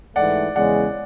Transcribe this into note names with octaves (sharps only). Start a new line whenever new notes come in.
G#2 E3 A3 D5 F#5
E2 C#3 G#3 D5 F#5